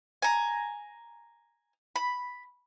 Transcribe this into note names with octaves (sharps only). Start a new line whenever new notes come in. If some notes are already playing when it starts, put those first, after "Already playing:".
G#5 A#5
B5